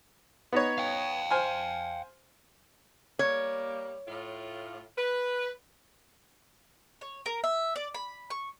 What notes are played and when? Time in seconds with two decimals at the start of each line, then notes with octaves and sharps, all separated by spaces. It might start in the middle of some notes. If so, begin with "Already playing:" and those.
0.53 B3 D#4 C#5
0.78 F5 G5
1.31 C5 G#5 F6
3.19 G3 A#3 C#5
4.07 A2 F4
4.97 B4
7.01 C#5
7.26 A#4
7.44 E5
7.76 D5
7.94 B5
8.30 C#6